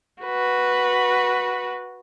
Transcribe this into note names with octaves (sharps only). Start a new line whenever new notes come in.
F#4 B4